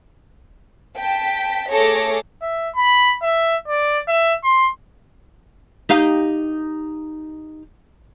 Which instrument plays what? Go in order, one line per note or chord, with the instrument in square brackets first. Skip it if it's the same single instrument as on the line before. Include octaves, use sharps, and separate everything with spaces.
[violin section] G5 A5 B6
A3 G#4 A4 C#5 D6 A#6
[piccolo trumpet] E5
B5
E5
D5
E5
C6
[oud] D#4 G4 F5